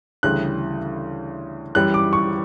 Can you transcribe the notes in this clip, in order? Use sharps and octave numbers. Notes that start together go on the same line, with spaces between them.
D2 C#3 E3 G3 F#6
F#2 E3 G3 F#6
D6
C#6